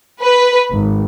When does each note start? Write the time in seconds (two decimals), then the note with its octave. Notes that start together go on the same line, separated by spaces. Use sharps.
0.22 B4
0.70 G#1